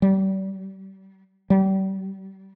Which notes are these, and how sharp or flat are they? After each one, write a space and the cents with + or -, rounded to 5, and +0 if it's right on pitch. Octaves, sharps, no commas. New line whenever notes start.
G3 -35
G3 -35